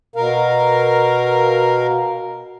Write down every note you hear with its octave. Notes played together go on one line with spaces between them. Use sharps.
B2 A#4 F5